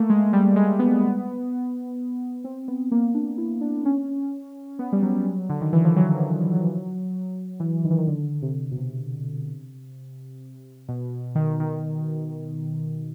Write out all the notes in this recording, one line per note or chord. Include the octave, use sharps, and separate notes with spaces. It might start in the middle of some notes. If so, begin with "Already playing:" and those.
Already playing: A3 A#3
G#3
G3
G#3
B3
C4
B3
A#3
D4
E4
D4
C#4
B3
G3
F#3
D3
D#3
E3
F3
F#3
E3
D#3
E3
D#3
D3
C3
B2
C3
B2
D#3
D#3